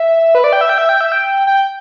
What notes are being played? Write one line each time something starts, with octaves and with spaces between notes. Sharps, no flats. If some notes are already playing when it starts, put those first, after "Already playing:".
Already playing: E5
B4
D5
G5
E5
G5
E5
G5
E5
G5
G5